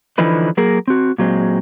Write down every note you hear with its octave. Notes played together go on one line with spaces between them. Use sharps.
D3 E3 F3 D#4 B4
F#3 A#3 G#4 A#4
C4 F#4
A#2 F#3 G#3 C4